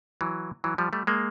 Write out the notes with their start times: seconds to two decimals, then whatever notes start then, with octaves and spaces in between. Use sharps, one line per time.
0.21 E3 F#3
0.64 E3 F#3
0.78 F3 G3
0.93 G3 A3
1.07 G#3 A#3